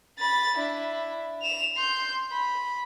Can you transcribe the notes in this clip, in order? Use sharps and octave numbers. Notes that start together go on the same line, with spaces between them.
B5 A6
D4 E4
E7 F7
C6 G6
B5